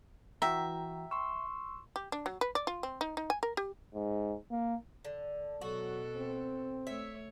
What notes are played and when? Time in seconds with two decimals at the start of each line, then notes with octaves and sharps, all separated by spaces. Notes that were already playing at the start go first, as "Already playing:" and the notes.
0.42 E3 F#4 E5 G5 A#5
1.11 C6 C#6 E6
1.96 G4
2.12 D4
2.26 F#3
2.41 B4
2.55 D5
2.67 F4
2.83 C4
3.01 D#4
3.17 D#4
3.30 G#5
3.43 A#4
3.57 G4
3.94 G#2
4.51 A#3
5.05 D3
5.61 B2 F#3 F#4 A4
6.16 C4
6.87 A3 C#5 E5